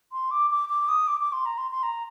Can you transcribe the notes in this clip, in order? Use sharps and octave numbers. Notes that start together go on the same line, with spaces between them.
C6
D6
D6
D6
D#6
D6
D6
C6
A#5
C6
C6
A#5